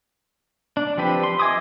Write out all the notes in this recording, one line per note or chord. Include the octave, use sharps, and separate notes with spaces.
D4
F3 C4 G4 B4
C6
D#5 E5 G#5 D6 D#6